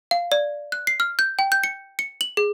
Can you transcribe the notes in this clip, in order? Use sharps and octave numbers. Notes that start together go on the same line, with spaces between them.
F5
D5
F#6
C7
F6
G6
G5
G6
C#7
C#7
F#7
G#4